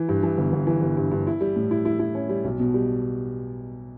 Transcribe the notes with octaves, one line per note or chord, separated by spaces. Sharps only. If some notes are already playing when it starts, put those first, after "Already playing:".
Already playing: E3
G2
E3
G1
G1
E3
G1
G2
G2
E4
G3
A2
E4
E4
E4
C#4
G3
B1
B2
G3